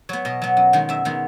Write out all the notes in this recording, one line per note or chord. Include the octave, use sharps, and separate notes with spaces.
F#3 B3 C#5
B2 D#5
F#3 B3
F#2
D#3 G#3 B3
F#2 E5
D#3 G#3 B3